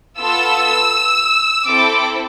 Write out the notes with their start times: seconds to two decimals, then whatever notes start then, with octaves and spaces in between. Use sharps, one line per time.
0.20 B3 F4 A4 E6
1.65 C4 E4 A4 D6